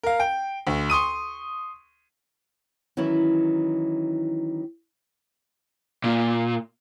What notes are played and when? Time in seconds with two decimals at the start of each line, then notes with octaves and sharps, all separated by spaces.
0.03 A#4 F5
0.20 G5
0.67 D2
0.90 C6 C#6 D#6 D#7
2.97 D#3 E3 F#3 C#4 E4
6.04 A#2